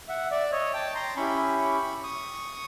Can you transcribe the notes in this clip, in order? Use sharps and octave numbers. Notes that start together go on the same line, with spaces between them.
E5 F#5
D5 E5
C#5 D#5
G5 A5
A#5 C6
C#4 E4 G4 B5 C#6
C#6 D#6